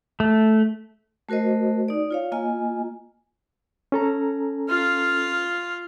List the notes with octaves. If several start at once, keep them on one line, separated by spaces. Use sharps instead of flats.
A3
A3 F#4 A#4 C5 D#5
D#4 D5
F4 C#5 F5
A#3 F4 D#5 G#5
C#4 A4 A#5
F4 F5